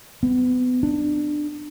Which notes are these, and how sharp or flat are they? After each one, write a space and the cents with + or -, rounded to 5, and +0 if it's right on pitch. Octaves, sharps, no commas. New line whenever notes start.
B3 +30
D4 +20